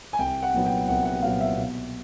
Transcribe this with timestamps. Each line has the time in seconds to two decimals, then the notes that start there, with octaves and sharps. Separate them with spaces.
0.13 G#5
0.18 C2 G5
0.43 F#5
0.54 A#2 F#3 B3
0.65 G5
0.88 C2 F#5
1.05 F#5
1.23 A#2 F#3 B3 F5
1.40 E5
1.58 B2